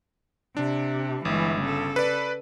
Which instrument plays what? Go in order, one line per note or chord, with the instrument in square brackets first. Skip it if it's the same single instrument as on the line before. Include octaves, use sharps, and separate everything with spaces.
[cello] C3 [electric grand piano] D4
[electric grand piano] G1 [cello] E3 G#3
[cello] C#3 A4
[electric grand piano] B4 D5